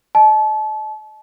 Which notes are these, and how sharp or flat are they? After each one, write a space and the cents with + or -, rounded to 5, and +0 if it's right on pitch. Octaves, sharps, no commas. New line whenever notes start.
D#5 -10 A5 -35